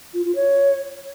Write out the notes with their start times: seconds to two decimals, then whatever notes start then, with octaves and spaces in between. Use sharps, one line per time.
0.14 F4
0.25 F4
0.35 C#5